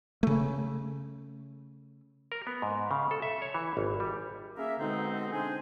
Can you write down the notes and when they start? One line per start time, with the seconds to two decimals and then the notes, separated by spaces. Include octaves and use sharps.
0.23 C#3 A3
2.32 A#4
2.47 B3
2.62 G#2
2.91 C#3
3.11 A4
3.22 E5
3.42 C#5
3.54 E3
3.77 G#1
4.00 G3
4.57 A#3 C#4 G#4 A#4 E5
4.79 B2 D3 G#3 C4 D#4
5.32 C4 D4 D#4 G#4 C5 G#5